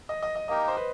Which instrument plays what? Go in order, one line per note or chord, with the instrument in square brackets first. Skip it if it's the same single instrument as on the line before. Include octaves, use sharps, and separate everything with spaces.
[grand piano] D#5
D#5
D#5
[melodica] A#3 D#4 G4 A#4 [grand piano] D#5
[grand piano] C5
B4